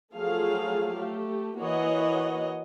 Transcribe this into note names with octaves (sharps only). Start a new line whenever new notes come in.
F3 F#3 A3 G#4 A4 F5
A3 G4
E3 A#3 F#4 C#5 D#5 F#5